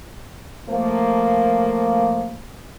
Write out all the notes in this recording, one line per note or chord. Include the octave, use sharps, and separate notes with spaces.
F3 A3 A#3